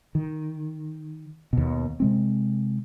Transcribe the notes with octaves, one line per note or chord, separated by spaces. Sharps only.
D#3
D#2 B2
C3 G#3 C4